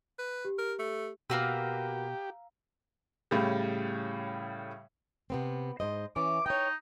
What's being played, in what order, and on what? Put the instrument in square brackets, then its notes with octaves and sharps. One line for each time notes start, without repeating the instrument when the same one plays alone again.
[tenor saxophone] B4
[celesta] G4
[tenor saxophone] A#4
A3
[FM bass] B2 [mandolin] A#3 F#4 B4 [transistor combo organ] G4 [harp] F5 A#5 E6
[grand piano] A2 C#3 G3
[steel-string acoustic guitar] C3 B3 C4
G#2 C5 D#5
[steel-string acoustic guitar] E3 C#4 [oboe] D6
[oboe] D#4 [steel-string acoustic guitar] C#5 G5